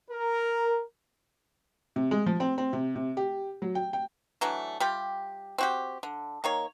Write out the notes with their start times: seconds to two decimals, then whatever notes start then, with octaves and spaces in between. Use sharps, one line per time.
0.11 A#4
1.96 C3
2.11 G#3
2.26 F3
2.40 C4
2.58 C4
2.73 C3
2.96 C3
3.17 G4
3.62 F#3
3.75 G5
3.93 G5
4.41 E3 F#3 A3 D4
4.80 G3 F4 G4
5.58 C4 F#4 G4
6.03 D3
6.44 D#3 A#3 C#5